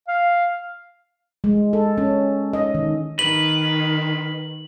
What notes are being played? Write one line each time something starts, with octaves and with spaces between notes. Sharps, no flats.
F5
G#3
A4
C#4
D#5
D#3
D#3 B4 F#7